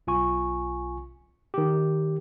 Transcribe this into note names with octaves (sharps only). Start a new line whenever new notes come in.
B1 F4 G#5 C#6
D#3 G4